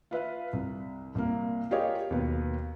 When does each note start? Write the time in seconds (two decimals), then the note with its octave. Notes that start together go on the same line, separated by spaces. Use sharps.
0.11 F4 B4 E5 F5
0.53 C2
1.15 C2 A#3
1.71 F4 G4 G#4 A#4 C#5 D#5
2.10 D#2 B2 B4